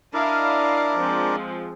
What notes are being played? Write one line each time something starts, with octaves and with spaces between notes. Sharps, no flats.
D4 E4 A#4 D5 D#5 F5
F3 G#3 C4